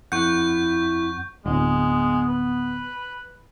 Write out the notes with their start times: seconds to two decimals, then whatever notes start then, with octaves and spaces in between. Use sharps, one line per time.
0.12 F2 E4 F#5 C#6 G6
1.46 D1 G#3 B3
2.29 B4